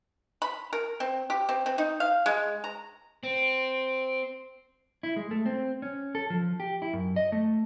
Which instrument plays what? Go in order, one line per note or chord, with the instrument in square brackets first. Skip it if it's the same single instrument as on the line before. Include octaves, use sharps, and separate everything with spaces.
[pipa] B5
A#4
C4
G4
C4
C4
D#4
F5
G#3
A#5
[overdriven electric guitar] C4
[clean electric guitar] E4
G#3
A3
C4
C#4
A4
F3
G4
E4
F#2
D#5
A3